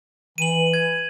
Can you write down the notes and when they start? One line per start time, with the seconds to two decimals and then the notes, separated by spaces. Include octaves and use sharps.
0.38 E3 D#7 F#7
0.74 G#6